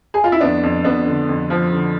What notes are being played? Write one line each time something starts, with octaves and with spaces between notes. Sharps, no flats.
G#4
F4
E4
F2 B3 D4
F2
F2 B3 D4
D3
F2
F3
D3